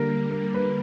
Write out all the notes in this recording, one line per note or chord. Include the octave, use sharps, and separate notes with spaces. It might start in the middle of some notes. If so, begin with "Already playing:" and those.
Already playing: D3 G3 A#3 A#4
A#4
B4